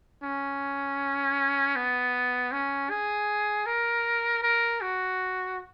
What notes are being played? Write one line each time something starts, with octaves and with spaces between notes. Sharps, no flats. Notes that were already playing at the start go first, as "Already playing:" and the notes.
C#4
B3
C#4
G#4
A#4
A#4
F#4